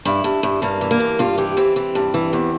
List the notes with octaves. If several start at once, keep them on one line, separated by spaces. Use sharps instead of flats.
G2 E4
G2
G2
G2 A#3
E3
A#3
G2
G2 F4
E3 G4
E3 C4
E3
G2
E3
E2